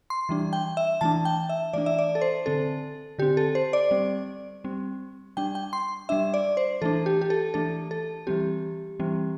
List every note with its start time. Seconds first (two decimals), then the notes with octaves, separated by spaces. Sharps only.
0.10 C6
0.29 E3 G3 D4
0.53 G5
0.77 E5
1.01 E3 A3 D4 A5
1.25 G5
1.49 E5
1.73 E3 A3 D4 D5
1.86 E5
1.98 D5
2.15 A4
2.21 C5
2.46 D3 C4 A4
3.19 D3 C4 G4
3.37 A4
3.55 C5
3.73 D5
3.91 G3 C4
4.64 G3 C4
5.37 G3 D4 G5
5.55 G5
5.73 C6
6.09 G3 D4 E5
6.34 D5
6.57 C5
6.82 E3 A3 D4 A4
7.06 G4
7.21 G4
7.30 A4
7.54 E3 A3 D4 A4
7.91 A4
8.27 E3 G3 C4 G4
8.99 E3 G3 C4